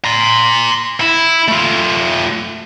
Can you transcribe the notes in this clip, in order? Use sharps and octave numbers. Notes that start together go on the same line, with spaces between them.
A#5 C6
E4
A3 F4